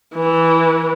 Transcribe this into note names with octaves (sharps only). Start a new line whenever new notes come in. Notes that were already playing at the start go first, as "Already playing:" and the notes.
E3